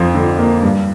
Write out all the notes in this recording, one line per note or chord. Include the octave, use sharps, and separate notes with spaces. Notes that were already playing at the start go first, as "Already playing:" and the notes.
Already playing: F2 F3
D3
A#3
G2